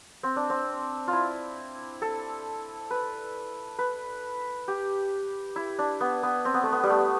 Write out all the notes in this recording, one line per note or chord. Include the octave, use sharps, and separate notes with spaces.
C4
D4
C4
F4
E4
A4
B4
B4
G4
E4
D4
B3
B3
C4
B3
A3
B3
G3
A3